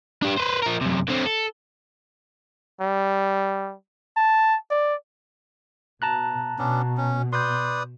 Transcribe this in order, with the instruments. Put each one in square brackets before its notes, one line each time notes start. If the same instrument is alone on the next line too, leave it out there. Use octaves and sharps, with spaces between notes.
[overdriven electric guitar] D4 G4
B4 C5
F3 A#4
F#2 C3
D3 C4
A4
[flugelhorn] G3
A5
D5
[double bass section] B2 [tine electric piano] A5 A#5 F#6
[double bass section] B2 [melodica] B3 C#4 D4
[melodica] C#4
[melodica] B4 D5 D#6 [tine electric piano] C6 G6